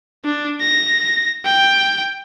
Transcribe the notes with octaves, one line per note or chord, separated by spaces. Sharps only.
D4
A#6
G5